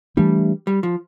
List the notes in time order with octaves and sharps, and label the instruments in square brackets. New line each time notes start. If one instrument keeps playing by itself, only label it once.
[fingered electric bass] E3 A3 D4 [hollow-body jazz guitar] G3
[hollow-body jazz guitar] G3
F3